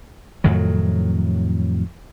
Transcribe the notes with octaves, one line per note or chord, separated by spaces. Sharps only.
F2 A2 D#3 F#3